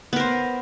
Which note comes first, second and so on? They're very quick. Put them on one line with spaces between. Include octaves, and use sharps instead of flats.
B3 A#4 C5